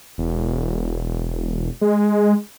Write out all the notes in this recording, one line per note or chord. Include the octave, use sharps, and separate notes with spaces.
E1
G#3